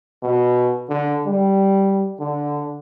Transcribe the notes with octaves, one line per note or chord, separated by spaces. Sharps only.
B2
D3
G3
D3